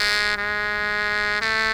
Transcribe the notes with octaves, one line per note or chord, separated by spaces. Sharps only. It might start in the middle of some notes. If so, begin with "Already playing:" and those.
Already playing: G#3
G#3
A3